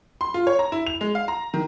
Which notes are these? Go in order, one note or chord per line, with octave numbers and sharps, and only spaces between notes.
C6
F4
C#5
A#5
E4
F7
G#3
F5
A#5
D#3